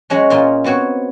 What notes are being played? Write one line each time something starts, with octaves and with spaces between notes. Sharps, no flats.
F#3 G#3 C#4
A#2 F4 D#5
B3 C4 F#4 C#5